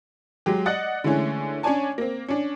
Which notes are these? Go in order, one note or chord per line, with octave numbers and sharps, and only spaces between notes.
F#3 G#3 G4
D5 D#5 F#5 F#6 A6
D3 E3 G#3 A3 C#4
C#4 D4 C#5 D5 G#5 A5
A#3 C4
C#4 D4